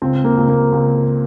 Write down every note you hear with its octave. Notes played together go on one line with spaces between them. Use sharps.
C#2 C4
A#3
C#2
A#3
C#2